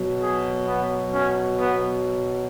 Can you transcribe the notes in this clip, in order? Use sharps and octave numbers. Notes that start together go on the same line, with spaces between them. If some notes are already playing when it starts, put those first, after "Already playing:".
Already playing: B2 F#3
G#4
B3
C#4
B3